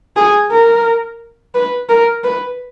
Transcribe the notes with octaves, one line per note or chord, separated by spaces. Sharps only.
G#4
A#4
B4
A#4
B4